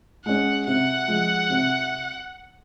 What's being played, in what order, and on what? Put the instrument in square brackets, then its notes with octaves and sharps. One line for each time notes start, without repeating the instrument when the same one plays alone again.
[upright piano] G#3 C#4 [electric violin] F#5
[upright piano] C3 [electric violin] F#5
[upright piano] F3 G#3
C3